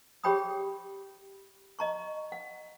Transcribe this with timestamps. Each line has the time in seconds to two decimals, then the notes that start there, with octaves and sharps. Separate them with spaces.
0.24 G4 G#4 C#5 G5 B5 D#6
1.79 D#5 A#5 C#6
2.32 F#5